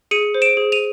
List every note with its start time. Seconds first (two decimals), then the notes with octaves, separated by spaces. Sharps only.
0.11 G#4 C#7 D#7
0.34 C5
0.42 D7 E7
0.57 G#4
0.72 D#7 F7